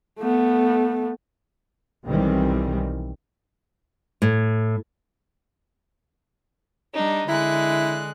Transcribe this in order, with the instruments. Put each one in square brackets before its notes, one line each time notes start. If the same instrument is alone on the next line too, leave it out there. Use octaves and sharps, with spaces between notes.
[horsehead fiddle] A3 B3
[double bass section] B1 D#3 E3 G3 C4
[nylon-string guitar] A2
[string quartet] G3 D4 D#4
[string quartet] D3 G#3 F#6 [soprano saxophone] E4